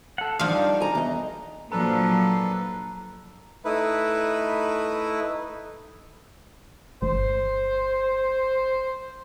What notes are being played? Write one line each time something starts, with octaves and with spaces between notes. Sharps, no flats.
A4 F#5
D#3 F3 G3 D4 D#4 F5
G#5 A#5
E2 D#5
A#2 F3 F#3 D4 A4 B4 A#5
A3 D#4 E4 B4
G1 C5